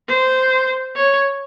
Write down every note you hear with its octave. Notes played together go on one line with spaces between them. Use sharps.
C5
C#5